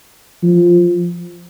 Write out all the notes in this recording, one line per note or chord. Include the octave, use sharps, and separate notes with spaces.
F3